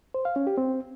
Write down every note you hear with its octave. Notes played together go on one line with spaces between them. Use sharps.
C5
F5
C#4
G4
C4